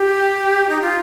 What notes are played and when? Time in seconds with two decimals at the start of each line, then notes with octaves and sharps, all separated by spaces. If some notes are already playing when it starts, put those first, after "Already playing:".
Already playing: G4
0.69 D#4
0.81 F4